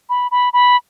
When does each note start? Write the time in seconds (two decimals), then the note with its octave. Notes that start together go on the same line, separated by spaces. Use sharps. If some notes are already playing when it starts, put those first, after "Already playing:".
0.10 B5
0.31 B5
0.53 B5